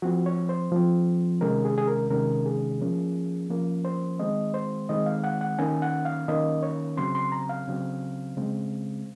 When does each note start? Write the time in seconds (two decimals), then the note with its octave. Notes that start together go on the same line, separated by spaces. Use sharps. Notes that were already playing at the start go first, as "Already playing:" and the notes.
0.02 F3 C4 F#4
0.26 C#5
0.49 C5
0.72 F3 C4
1.41 C3 D#3 G#3 C#4 A#4
1.65 G#4
1.78 G#4
1.87 A#4
2.10 C3 D#3 G#3 C#4 A#4
2.46 G#4
2.81 F3 A#3 C#4
3.50 F3 A#3 C#4
3.85 C5
4.19 D#3 G#3 C4 D#5
4.54 C5
4.89 D#3 G#3 C4 D#5
5.06 F5
5.24 F#5
5.41 F#5
5.59 D#3 A#3 C#4 G#5
5.82 F#5
6.05 F5
6.28 D#3 A#3 C#4 D#5
6.63 C#5
6.97 C#3 F#3 C4 C6
7.15 C6
7.32 A#5
7.49 F5
7.68 C#3 F#3 C4
8.37 C#3 G#3 C4